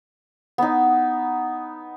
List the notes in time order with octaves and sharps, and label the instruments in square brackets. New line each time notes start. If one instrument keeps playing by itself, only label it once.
[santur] B3 D#4